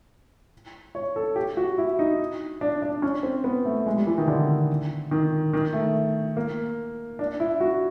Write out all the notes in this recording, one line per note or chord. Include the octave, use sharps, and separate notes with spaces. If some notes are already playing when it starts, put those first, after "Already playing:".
C#5
A4
G4
F#4
E4
D#4
D4
D4
C#4
C4
B3
A3
G#3
G3
E3
D#3
D3
D#3
D#3
A3
A#3
D4
E4
F#4